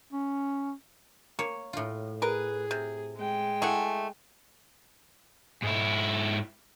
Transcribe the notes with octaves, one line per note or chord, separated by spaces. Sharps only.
C#4
A#3 C#5
A2 F4
G#4 A#4 B4
C3
G#3 G5
A3 E4 G#4 F#5
G#2 E4